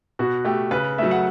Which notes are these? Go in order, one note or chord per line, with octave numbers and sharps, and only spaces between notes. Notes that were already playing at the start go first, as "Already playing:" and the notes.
B2 F#4
A3 G4
C#3 B4
F#3 A3 E5
F#5